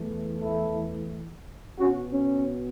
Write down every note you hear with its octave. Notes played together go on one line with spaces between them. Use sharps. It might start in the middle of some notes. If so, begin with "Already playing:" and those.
Already playing: E2 E3 A3
E4 A4
B2 B3 C#4 F#4
C#4